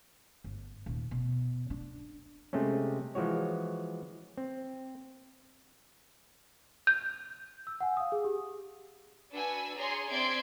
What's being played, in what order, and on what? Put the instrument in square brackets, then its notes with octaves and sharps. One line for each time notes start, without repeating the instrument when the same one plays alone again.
[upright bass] G1
D#1
B2
D4
[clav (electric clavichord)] C3 G#3 A3 C4 C#4
E3 F3 G#3 F#4 C#5
C4
[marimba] G6
[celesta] E6
F#5 G#5
F5 D#6
G#4
G4
[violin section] D4 F#4 B4 G#5 E6
G#4 C#5 D5 G#5 A#5 C6
C4 D5 E5 C6 G#6 D7